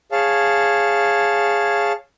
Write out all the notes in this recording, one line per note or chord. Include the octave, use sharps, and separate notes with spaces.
G#4 C#5 F5 A5